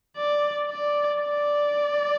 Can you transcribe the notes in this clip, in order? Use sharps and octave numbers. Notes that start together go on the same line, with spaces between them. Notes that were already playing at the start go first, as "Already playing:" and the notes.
D5
D5
D5